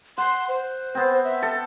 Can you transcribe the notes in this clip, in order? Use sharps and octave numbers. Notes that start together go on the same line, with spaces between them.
F#5 C6
C5
B3 C4
E5
A4